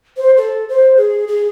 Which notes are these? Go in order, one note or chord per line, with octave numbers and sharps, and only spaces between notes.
C5
A4
C5
G#4
G#4